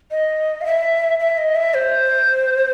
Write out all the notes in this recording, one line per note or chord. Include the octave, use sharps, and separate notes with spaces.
D#5
F5
E5
E5
D#5
E5
C5